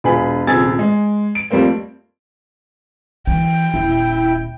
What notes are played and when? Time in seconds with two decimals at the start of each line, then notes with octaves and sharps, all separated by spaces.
0.04 E1 F4 G#4 B5
0.47 D#1 C2 G#4 E6 G#6 A6
0.79 G#3
1.35 D7
1.51 F2 G3 A3 A#3 C4
3.27 E3 G5
3.74 D#1 E4